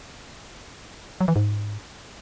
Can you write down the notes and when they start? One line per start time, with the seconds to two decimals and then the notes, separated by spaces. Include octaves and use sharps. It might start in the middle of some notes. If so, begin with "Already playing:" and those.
1.21 F#3
1.28 E3
1.36 G#2